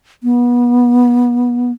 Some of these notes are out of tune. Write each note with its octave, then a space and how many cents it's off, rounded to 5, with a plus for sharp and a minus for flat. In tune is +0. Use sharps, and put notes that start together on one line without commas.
B3 -25